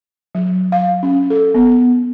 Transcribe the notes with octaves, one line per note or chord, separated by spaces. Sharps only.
F#3
F5
C#4
A4
B3